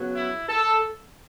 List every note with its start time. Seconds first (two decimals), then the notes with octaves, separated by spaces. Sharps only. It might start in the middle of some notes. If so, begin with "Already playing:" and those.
Already playing: C#3 F#3 B3
0.15 E4
0.49 A4